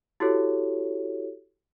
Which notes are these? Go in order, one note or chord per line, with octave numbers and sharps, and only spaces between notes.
E4 F#4 G4 A4 C#5